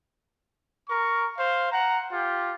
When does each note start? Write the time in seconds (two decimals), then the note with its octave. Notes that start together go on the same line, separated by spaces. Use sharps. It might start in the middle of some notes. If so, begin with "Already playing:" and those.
0.89 A#4 C#6
1.37 C5 F5
1.72 F#5 A#5
2.12 F4 G4